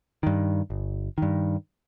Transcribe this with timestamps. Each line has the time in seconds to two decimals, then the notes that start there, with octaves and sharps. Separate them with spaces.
0.23 G2 D#3
0.70 G1
1.18 G2 D#3